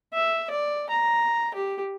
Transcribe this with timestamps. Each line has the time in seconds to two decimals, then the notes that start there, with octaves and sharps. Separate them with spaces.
0.13 E5
0.50 D5
0.90 A#5
1.55 G4